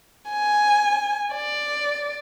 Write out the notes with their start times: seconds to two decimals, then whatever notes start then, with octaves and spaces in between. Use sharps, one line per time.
0.31 G#5
1.33 D5